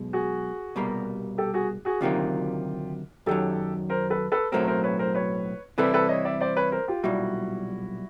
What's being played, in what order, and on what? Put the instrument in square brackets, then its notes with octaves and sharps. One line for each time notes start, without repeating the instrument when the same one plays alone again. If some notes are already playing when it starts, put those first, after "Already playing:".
Already playing: [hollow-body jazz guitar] B1 B2 G#3
[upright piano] F#4 G#4
[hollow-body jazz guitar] C2 B2 G3 A#3
[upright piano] G4 A4
F#4 G#4
F#4 G#4
[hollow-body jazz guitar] D2 C3 D#3 F#3 A#3 [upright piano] F4 G4
[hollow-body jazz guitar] F#2 D#3 F#3 [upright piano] G4 A4
[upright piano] A#4 C5
A4 B4
A4 B4
[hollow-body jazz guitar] B1 A2 F#3 A3 C4 [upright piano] A#4 C5
[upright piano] A#4 C5
B4 C#5
A#4 C5
B4 C#5
[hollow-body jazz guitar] C3 E3 G3 C4 E4 [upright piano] A4 B4
[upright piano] A4 B4
C#5 D#5
D5 E5
C5 D5
B4 C#5
A#4 C5
F4 G4
[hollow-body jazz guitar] B1 A#2 G3 [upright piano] E4 F#4